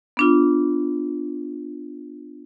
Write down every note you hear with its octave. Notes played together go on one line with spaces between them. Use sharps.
B3 D4 F4